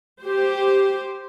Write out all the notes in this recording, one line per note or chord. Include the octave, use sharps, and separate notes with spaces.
G4 C5